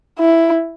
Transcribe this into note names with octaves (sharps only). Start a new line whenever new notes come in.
E4